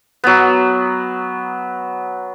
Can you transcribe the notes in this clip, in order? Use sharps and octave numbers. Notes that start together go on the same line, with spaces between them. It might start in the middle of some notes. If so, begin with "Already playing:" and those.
F#3 B3